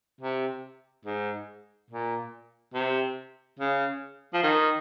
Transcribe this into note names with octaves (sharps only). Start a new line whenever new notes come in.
C3
G#2
A#2
C3
C#3
F3
D#3